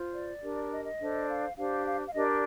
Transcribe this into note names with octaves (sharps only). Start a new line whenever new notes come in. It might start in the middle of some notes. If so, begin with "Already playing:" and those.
Already playing: F4 C5
D5
D4 G4 A#4
D#5
D#5
D4 A4 C5
F5
D4 G4 C5 F5
F5
F5
D4 G4 A#4 D#5
D5